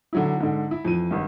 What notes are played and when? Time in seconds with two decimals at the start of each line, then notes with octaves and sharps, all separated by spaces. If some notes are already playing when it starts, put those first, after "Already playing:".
0.13 D3 F#3 E4
0.40 G#2 D3
0.71 E4
0.85 F2 E3 D#7
1.11 G#1 G2